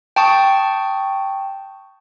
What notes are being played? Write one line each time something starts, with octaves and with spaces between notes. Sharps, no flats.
G5 A5 C#6 D#6